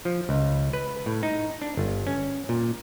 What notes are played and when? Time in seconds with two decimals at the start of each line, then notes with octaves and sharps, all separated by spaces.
0.05 F3
0.29 C#2
0.73 B4
1.06 A2
1.23 D#4
1.62 D4
1.77 G1
2.07 C#4
2.49 A#2